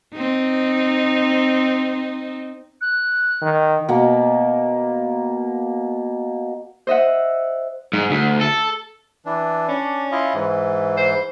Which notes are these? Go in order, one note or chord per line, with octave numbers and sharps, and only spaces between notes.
C4 D#4
F#6
D#3
B2 A#3
C5 D#5 E5 F#5
G#2
D2
A4
E3 D4
C#4 D4
E4 F4 D#5
G#2 E3
C5